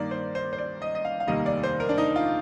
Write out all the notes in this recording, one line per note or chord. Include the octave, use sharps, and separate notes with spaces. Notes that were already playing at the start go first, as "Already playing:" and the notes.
Already playing: G2 D#3 A#3 D5
C5
C5
C5
D5
D#5
D#5
F5
F5
F1 D#2 D#3 G3 A#3 D#5
D5
C5
A#4
D4
D#4
F4